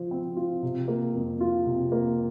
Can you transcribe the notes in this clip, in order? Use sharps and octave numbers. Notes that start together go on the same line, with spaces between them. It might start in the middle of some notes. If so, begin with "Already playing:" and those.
Already playing: F3 C5
C4
F4
C3
A#3
F2
F4
C3
A#3